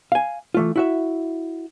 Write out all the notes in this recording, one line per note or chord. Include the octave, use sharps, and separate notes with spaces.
F5 G#5
E3 A3 F4
E4 F#4 E5